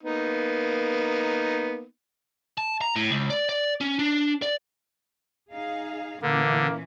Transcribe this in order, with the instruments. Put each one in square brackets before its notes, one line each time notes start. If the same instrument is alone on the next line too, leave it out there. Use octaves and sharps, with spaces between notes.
[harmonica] A#3 B3 D#4
[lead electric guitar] A5
A#5
A2
C#2
D5
D5
C#4
D4
D5
[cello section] D#4 G#4 F5
[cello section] A#2 E3 C#4 [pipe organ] D3 [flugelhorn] A#3